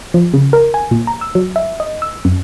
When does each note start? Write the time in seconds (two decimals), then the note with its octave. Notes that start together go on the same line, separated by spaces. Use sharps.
0.14 F3
0.34 C#3
0.53 A#4
0.74 G#5
0.91 A#2
1.07 A#5
1.21 E6
1.35 F#3
1.56 E5
1.80 D#5
2.02 E6
2.25 F#2